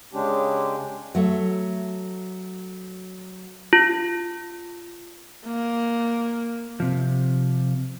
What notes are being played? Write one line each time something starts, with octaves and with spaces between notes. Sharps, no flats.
C#3 G#3 C#4 D4 G4
F#3 A3
F4
A#3
C3 F3